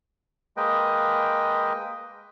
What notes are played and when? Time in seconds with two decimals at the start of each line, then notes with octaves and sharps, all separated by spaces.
0.57 G#3 A#3 B4 D#5 G5